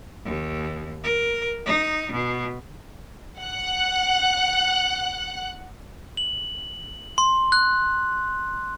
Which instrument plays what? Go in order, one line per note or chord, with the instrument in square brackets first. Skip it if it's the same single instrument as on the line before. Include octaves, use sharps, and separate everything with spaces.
[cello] D#2
A#4
D#4
B2
[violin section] F#5 F#6
[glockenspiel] F#7
C6
F#6